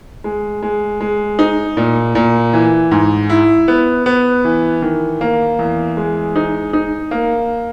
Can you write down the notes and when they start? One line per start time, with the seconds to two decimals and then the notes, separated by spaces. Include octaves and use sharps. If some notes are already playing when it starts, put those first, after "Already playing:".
0.24 G#3
0.63 G#3
1.01 G#3
1.39 D#4
1.77 A#2
2.15 A#2
2.53 E3
2.91 G#2
3.30 E4
3.68 B3
4.06 B3
4.45 E3
4.82 D#3
5.21 A#3
5.59 E2
5.97 G#3
6.36 D#4
6.73 D#4
7.11 A#3